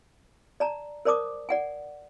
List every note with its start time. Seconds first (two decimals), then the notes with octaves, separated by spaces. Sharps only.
0.60 D5 A5 A#5
1.05 A#4 C5 D5 A5 D6 D#6
1.49 D5 F#5 G#5